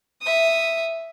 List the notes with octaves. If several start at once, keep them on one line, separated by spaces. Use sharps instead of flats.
E5 D#6